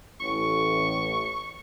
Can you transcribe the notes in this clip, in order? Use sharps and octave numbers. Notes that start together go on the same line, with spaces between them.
A1 C#6